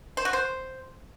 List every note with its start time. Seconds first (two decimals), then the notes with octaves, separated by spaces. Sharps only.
0.17 C5
0.25 F#4
0.33 C5